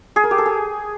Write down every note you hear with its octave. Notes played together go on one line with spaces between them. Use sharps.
G#4
A#4
G4
A4
G#4